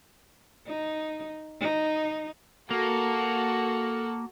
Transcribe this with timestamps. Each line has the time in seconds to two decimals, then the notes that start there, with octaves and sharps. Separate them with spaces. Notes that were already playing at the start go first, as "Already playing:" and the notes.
0.67 D#4
1.61 D#4
2.71 A#3 F#4 A4